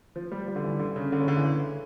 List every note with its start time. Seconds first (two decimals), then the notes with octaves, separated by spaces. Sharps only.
0.16 F3
0.32 G3
0.48 G3
0.56 D3
0.64 E3
0.79 D3
0.96 C#3
1.12 D3
1.20 C#3
1.28 D3
1.36 E3